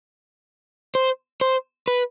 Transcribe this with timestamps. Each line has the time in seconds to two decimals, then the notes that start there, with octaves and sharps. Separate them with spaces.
0.95 C5
1.41 C5
1.88 B4